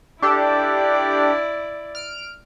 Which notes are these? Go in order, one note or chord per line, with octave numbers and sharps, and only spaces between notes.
D4 E4 G4 A4 D5
F6 D7